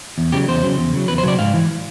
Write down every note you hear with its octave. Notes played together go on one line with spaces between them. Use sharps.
E2
C#3 F#3 G4
E2 C5
C#3 F#3
E2
C#3 F#3
E2 B4
C5
C#3 F#3 D5
G#2 F5
E3